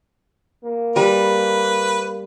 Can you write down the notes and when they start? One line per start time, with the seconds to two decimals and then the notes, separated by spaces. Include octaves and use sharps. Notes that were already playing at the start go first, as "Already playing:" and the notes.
0.64 A#3
0.96 G3 B4